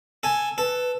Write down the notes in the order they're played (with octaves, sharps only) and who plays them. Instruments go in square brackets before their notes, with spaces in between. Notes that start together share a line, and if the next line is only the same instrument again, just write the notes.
[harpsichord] A4 G#5
[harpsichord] A4 [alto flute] B4